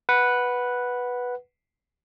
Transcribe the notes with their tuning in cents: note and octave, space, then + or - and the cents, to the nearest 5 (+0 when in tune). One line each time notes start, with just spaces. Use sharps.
B4 -5 F#5 +0